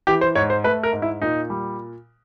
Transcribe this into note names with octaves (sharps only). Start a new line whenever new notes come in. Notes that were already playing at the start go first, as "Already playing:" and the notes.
E3 G4
C5
G#2 C#5
C5
A3 B4
A#4
G#2
E4
A#2 D#4
G3